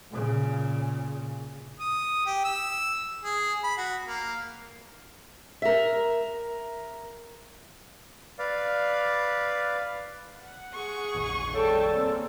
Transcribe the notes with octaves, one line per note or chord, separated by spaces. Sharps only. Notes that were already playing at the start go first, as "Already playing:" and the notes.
A#2 C#3
D#6
G4
E6
G#4
B5
F#4
A#3
A#4 E5
B4 D5 F5
F#5
G#4 C#6
F1 A#1 D#2
C#3 G3 A4 C#5 G5 A5
A#3 C4